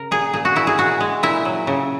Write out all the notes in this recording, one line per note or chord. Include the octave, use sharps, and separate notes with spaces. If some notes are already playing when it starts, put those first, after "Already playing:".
Already playing: C#3 A#4
A#2 G#4
A#2 G#4
F#4
A#2 E4
G#4
A#2 F#4
G#3
A#2 E4
F#3
C#3